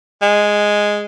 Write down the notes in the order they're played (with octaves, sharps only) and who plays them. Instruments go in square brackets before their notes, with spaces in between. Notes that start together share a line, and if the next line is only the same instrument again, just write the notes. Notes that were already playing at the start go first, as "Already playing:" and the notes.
[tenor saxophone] G#3